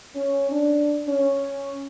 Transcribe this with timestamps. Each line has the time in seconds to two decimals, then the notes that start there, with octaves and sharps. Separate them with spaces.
0.15 C#4
0.52 D4
1.08 C#4